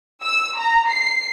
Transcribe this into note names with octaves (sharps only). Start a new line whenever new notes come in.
E6
A#5
C7